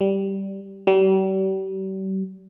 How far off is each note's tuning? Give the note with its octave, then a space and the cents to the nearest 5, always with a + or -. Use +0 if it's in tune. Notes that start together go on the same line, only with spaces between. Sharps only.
G3 -10
G3 -40